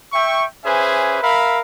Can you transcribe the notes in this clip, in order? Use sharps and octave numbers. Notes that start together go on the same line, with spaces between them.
E5 G5 C#6
C#4 G#4 B4 C5 E5 G#5
A#4 E5 F5 B5